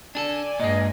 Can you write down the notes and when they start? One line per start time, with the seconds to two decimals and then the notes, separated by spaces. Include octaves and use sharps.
0.15 D4 G#4 A4 D5 G#5
0.60 G2 A#2 G#3 D#5